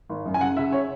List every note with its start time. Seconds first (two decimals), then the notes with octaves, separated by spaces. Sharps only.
0.09 G#1
0.26 F#2
0.34 G#5
0.41 C#3 F#5
0.57 C#3 E5
0.72 C#5